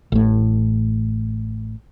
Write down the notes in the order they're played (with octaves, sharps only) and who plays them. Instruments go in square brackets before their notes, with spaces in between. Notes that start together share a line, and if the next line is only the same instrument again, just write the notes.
[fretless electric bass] A1 A2